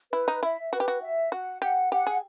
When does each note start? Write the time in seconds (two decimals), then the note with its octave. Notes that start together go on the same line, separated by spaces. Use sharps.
0.12 E4 B4
0.28 D#4
0.43 E4 E5
0.73 F#4 B4
0.80 G4
0.88 F#4
1.02 E5
1.32 F#4 F#5
1.62 G4 F#5
1.92 G4 F#5
2.07 G#4